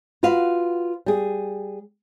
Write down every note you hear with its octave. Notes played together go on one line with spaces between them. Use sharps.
F4 F#4 B4 F5
G3 G#4